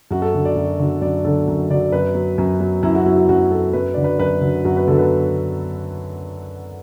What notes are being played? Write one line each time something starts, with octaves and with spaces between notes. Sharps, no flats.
F#2 F#4
A4
D3 F#3
D5
F#2
D3 F#3
F#2 D5
D3 F#3 A4
F#2
D3 F#3 D5
F#2 B4
F#3
F#2
F#3
F#2 E4
F#4
F#3 E4
F#4
F#2 F#4
F#3 A4
F#2 B4
D3 F#3 D5
B4
F#2 B4
D3 F#3
F#2 F#4
B4
D3 F#3 A4
B4